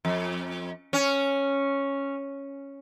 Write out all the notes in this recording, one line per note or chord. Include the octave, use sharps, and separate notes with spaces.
F2
C#4